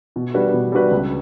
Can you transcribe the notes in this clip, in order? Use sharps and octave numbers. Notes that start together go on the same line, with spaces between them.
B2
G3 D4 F#4 B4
B2
G3 D4 F#4 B4
C#2